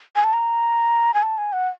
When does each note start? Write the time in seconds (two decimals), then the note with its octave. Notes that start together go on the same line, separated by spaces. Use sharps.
0.16 G#5
0.24 A5
0.33 A#5
1.14 G#5
1.23 A5
1.38 G#5
1.53 F#5